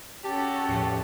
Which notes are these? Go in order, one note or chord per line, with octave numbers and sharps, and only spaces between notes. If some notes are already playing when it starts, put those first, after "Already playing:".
C#4 F#4 G4 A4 A5
E2 A2 F3